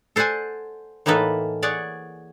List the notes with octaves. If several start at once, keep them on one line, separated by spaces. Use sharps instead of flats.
A4 C5 D5 F#5 G#5
A2 E3 A#3 D#4 A4 B4
G#4 C#5 D5 F#5